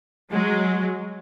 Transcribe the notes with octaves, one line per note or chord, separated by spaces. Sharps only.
F#3 G#3